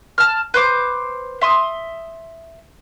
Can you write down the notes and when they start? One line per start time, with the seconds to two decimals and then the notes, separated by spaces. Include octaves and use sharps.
0.18 A5 F6
0.54 B4 C5 D6
1.41 E5 C6 D#6